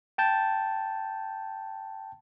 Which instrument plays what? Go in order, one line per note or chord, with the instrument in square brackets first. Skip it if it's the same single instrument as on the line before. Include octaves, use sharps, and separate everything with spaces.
[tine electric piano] G5 A5 G6